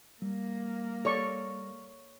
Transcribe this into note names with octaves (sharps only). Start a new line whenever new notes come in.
G3 A#3
A4 C#5 D5 C#6